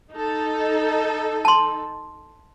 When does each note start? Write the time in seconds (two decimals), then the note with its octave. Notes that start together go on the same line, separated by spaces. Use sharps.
0.13 D#4 A4
1.45 A5 C6